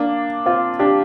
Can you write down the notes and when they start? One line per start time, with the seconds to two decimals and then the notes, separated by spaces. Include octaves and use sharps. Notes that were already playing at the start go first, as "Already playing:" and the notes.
Already playing: A#3 D4
0.46 C4 F4
0.79 D4 G4